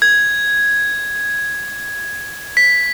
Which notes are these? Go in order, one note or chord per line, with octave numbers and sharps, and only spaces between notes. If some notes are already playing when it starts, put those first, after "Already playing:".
G#6
B6